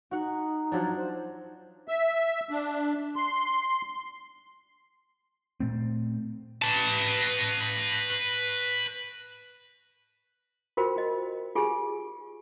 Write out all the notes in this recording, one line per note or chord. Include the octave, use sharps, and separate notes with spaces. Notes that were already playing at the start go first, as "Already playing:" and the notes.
D#4 F#4 F#5
F3 F#3 D4
C5
E5
D4
C6
A#2 A3 C4
B4 A5
F4 F#4 A#4 C5 G5
F4 D#5
F4 G4 G#4 G#5